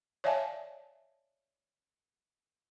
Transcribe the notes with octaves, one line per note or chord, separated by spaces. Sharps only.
C#5 D5 E5 F5 G#5 A5